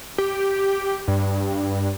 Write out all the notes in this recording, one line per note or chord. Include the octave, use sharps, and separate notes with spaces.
G4
G2